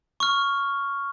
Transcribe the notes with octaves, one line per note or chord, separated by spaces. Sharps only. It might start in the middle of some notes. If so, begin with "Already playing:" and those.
C#6 F6